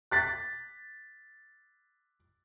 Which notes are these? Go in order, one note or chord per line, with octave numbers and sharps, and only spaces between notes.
F#6 A6 B6